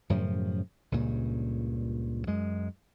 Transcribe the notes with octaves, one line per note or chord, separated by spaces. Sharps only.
F#2 A2 C#3 F3
C#2 G2 A#2 C#3
F#2 G#3